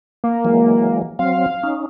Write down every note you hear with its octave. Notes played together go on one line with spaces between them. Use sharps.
A#3
E3 F#3 G#3
F#3 C4 F5
C#4 D#4